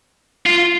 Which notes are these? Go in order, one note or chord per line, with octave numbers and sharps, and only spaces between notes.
F4